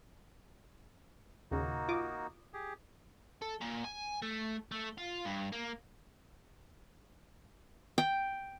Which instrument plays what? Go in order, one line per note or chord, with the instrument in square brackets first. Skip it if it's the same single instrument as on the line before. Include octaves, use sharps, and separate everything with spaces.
[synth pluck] D#2 A#2 C#3 [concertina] A#3 D#4 F#4
[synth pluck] F4 D6 D#6
[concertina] G4 G#4
[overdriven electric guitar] A4
A#2
G#5
A3
A3
F4
G2
A#3
[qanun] G5